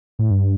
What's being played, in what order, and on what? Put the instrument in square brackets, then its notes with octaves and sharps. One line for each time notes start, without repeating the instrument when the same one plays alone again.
[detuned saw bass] A2
G2